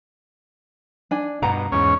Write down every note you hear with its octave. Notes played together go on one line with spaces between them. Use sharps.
D4 G#5
G2 B2 B4 F#5 A#5
E2 G#2 C#4